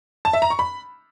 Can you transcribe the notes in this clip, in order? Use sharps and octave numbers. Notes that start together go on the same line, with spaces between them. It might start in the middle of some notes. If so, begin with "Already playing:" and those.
A5
E5
A#5
C#6
B5